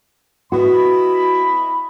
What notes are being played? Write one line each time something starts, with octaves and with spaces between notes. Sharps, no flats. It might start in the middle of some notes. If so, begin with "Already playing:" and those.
B3 E4 F#4 D#5 B5